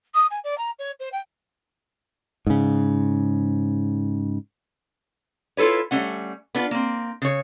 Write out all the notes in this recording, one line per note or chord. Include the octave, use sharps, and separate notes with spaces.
D#6
G#5
D5
A#5
C#5
C5
G5
G#2 C#3
E4 F4 A4 B4 C#5
G3 A3 C#4 F#5
B3 D4 F4
A#3 C4
C#3 C#5